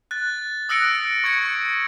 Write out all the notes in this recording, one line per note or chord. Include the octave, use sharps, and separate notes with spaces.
F#6 A6
D#6 E6 F#6 A#6 C#7 D7
C#6 G#6 C#7